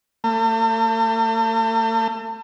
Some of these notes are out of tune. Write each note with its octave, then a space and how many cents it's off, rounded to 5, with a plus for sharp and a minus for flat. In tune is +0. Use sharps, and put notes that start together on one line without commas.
A3 +45